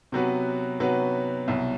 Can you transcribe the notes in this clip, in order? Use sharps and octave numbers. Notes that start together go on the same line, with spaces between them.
C3 F#3 B3 F#4 B4
C3 F#3 B3 F#4 B4
C2 B2 F#3